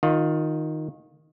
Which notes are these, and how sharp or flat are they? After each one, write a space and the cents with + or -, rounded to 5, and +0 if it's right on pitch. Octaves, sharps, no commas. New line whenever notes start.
D#3 +0 F4 +25